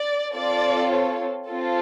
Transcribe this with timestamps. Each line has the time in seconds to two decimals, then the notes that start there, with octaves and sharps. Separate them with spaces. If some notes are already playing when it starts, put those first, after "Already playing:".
Already playing: D5
0.34 C4 F4 A4 D5
0.91 C#5
1.48 C4 F4 A4